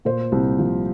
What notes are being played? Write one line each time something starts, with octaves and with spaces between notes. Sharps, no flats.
A#2 C5
C2
F3